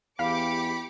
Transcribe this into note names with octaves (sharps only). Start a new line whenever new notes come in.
E2 G4 F5 B5 D6 C#7